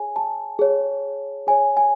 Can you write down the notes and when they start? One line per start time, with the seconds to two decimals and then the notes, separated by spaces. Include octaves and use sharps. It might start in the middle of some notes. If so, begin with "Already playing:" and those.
Already playing: G#4 C#5 G#5
0.16 A5
0.59 G#4 C#5
1.47 G#4 C#5 G#5
1.77 G#5